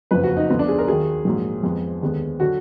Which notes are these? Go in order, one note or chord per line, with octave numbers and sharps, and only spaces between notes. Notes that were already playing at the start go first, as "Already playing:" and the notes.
F#1 F2 F3 B4
F#4
D#4
D2 D3 F3 B3
D4
G#4
A#4
D#2 D#3 F#3 G#4
A#1 G#2 F#3 A#3
F2 F3 G#3 B3
D#2 D3 G#3 B3
D3 F#3 F#4